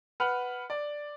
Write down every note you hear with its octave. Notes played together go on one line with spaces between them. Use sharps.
B4 F#5 F6
D5